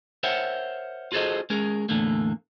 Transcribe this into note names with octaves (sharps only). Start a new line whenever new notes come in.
A#4 C5 C#5 E5 F#5 G5
F4 F#4 G#4 A4 C5 D#5
G#3 C#4 G#4 A#4
E2 A2 D3 A3 A#3